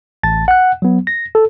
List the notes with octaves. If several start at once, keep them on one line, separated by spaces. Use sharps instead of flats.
A1 A5 A6
F#5 F#6
F#3 B3
A#6
A4